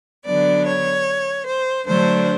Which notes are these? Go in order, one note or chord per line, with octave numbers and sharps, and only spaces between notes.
D3 F#3 B3 D4 D5
C#5
C5
D3 F#3 A3 D4 C5